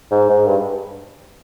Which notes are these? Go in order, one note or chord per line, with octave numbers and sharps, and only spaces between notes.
G#2
G#2
G2